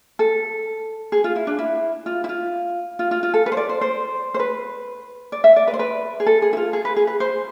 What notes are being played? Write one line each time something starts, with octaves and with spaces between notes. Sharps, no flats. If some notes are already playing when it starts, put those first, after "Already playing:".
A4
G#4
F4
E4
D4
E4
F4
E4
F4
F4
F4
F4
A4
B4
C5
D5
C5
C5
C5
B4
D5
E5
D5
B4
C5
B4
G#4
A4
G#4
E4
F4
G#4
B4
G#4
B4
C5